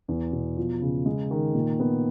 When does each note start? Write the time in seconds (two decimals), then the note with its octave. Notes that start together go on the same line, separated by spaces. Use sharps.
0.08 E2
0.32 B2
0.57 F3
0.81 C#3
1.06 G#3
1.31 D#3
1.55 A#2
1.80 B3